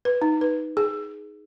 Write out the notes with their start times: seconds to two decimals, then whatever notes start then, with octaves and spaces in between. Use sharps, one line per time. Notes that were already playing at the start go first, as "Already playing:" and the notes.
0.05 B4
0.22 D#4
0.41 B4
0.77 G#4